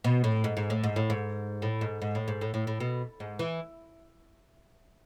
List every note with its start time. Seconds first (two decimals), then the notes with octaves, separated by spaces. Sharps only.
0.04 B2
0.24 A2
0.44 G#2
0.57 G#2
0.70 A2
0.84 G#2
0.96 A2
1.10 G#2
1.62 A2
1.81 G#2
2.02 G#2
2.15 A2
2.28 G#2
2.41 A2
2.54 A2
2.67 A2
2.80 B2
3.20 G#2
3.39 E3